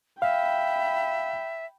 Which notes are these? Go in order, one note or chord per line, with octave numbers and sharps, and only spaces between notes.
E5 F5 G5 B5